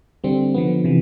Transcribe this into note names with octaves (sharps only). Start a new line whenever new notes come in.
D3 G3 C4
D3 F3 B3
C3 E3